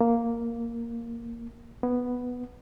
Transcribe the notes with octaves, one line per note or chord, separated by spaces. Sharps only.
A#3
B3